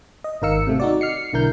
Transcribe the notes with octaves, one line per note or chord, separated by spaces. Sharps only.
D#5
G#1 D#3 A#4 F5 E6 C#7
C3 A3
D#4 F#4 D5
F6 C7 C#7
B1 D3 E4 A#4 G6